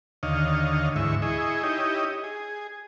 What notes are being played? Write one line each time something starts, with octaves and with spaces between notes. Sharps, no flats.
D#2 D3 C#5 D#5 F5
D2 G#2 E3 E5 C#6
E4 G#4 D#5 C#6
D#4 E4 G4 C#5 D#5
G#4